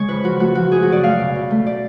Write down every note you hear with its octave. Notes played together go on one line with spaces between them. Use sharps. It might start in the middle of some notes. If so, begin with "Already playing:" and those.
Already playing: C#3 G#3 C#5
F2 B4
F3 F#4
A3 F#4
F3 F#4
F#2 G#4
F#4
C#3 D5
A3 F5
B2
B2
A3
D5